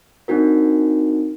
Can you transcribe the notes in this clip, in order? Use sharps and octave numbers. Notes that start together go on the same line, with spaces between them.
C4 D4 D#4 F#4 A#4